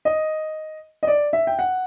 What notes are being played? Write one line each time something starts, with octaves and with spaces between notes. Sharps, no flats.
D#5
D#5
D5
E5
G5
F#5